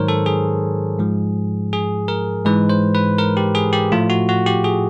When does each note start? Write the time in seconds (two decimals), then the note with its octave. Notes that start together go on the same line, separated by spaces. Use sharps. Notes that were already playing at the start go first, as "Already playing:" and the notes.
Already playing: G#2 D#3 F#3 A#4 C5 C#5
0.08 A4
0.26 G#4
0.99 G#2 F3 G#3
1.73 G#4
2.08 A#4
2.45 G#2 E3 G#3 B4
2.69 C5
2.95 B4
3.18 A#4
3.37 G4
3.55 G#4
3.73 G4
3.92 A2 F3 A3 F4
4.10 F#4
4.29 F#4
4.46 G4
4.64 G#4